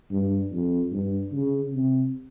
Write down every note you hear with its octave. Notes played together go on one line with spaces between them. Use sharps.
G2
F2
G2
C#3
C3